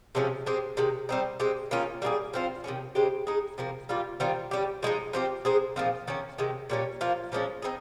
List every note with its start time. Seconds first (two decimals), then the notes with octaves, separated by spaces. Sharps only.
0.15 C3 F3 G#3 C#4
0.46 G#3 C4 G4
0.77 C3 D#3 G#3
1.09 G3 C4 D#4
1.40 G#3 C4 G4
1.71 D#3 A#3 C#4 F4
2.02 G3 A#3 F4 G#4
2.34 F3 C4 F4
2.64 C3 D#3 G#3 C#4
2.95 C#3 G#3 C4 G4
3.27 G#3 D#4 G#4
3.58 C3 F3 A#3
3.89 G3 A#3 F4
4.20 D#3 G3 C4 F4
4.51 G3 C#4 G4
4.83 F3 G#3 D#4
5.13 F3 C4 G4
5.45 G#3 C4 D#4 G#4
5.76 A#2 F3 C4 D#4
6.08 D#3 A#3 C#4
6.38 C3 D#3 G#3
6.70 A#2 G3 C#4
7.01 F3 A#3 F4
7.32 A#2 F3 G#3 C#4
7.62 C4 D#4 G#4